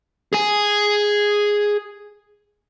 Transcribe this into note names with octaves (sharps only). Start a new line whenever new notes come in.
G#4 G#5